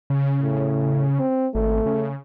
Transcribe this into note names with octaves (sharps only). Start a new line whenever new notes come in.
C#3
A2
C4
G#1 A3
C#3